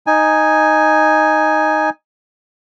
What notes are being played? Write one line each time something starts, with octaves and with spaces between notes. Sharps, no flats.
D#4 G#5